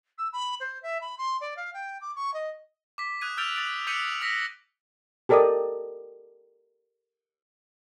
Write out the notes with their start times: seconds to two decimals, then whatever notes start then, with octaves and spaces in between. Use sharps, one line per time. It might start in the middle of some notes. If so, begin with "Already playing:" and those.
0.18 E6
0.33 B5
0.60 C5
0.83 E5
1.01 B5
1.18 C6
1.41 D5
1.56 F5
1.74 G5
2.01 D6
2.15 C#6
2.34 D#5
2.98 D6 B6
3.21 D#6 F#6 G#6 D#7
3.37 E6 F6 G6 A6 D7 F7
3.56 D#6 A6 D7
3.87 D6 G6 B6 C#7 D#7 F#7
4.22 E6 A#6 B6
5.29 G4 A4 A#4 D5 D#5 D#6